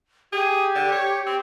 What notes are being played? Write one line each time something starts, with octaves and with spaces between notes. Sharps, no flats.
G4 G#4
D3
C#5
C4